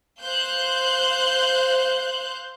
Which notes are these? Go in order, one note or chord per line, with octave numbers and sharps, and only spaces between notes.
C5 F5 F#6 G6